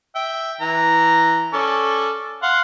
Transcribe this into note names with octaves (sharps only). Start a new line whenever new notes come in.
E5 G5
E3 A#5
C#4 A4 D5
F5 F#5 C6